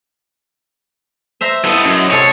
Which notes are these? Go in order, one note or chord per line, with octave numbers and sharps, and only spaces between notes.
C5 E5 A#5
B3 E4 A4 D#5
F#2
C3 G#3 A4 C#5